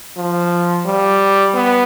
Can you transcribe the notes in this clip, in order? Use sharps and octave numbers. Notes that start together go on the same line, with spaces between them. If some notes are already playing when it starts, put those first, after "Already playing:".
F3
G3
B3